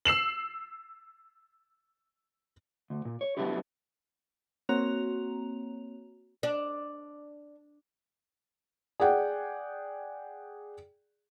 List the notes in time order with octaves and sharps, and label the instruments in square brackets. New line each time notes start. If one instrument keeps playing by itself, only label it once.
[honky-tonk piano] E6 C7 E7 F#7
[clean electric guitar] D2
A#2
C#5
F#3 A3 B3 D4 E4 G4
[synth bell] A#3 C4 F#4 C#5 A#5 F7
[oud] D4
[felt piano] G#4 D5 F#5 G5